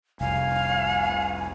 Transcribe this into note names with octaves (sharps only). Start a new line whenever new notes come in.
F1 C2 F5 G#5